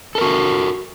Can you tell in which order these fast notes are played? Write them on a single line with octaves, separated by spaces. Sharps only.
A4 A#4 F#4